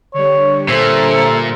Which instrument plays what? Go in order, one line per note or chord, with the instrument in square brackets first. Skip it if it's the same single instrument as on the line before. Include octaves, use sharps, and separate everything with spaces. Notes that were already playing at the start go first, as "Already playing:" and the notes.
[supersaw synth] D3 G3 [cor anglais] C#5
[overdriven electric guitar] A#2 [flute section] A4 E5 E6 [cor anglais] C5